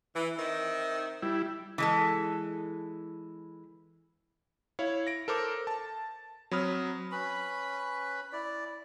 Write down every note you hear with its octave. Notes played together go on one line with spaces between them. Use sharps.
E3
D#3 C4 E5
G3 E4
E3 G#3 A4
E4 C#5 F5
A#6 D7
A4 A#4 C5 D6
A5
F#3 C4 B5 D#6 F6
C#4 B4 B5
E4 D5